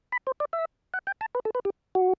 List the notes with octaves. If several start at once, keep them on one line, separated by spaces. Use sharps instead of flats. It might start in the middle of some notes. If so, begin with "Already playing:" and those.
B5
C5
D5
E5
F#5
G5
A5
B4
A4
B4
G4
F#4